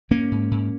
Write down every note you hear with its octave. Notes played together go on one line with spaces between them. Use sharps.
G#2 A#3 C#4
G#2
G#2